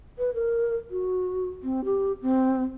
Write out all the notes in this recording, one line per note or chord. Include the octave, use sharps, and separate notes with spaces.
B4
A#4
F#4
C4
G4
C4